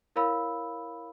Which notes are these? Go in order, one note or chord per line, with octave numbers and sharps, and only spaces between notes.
E4 A#4 C#5 F5 B5 E6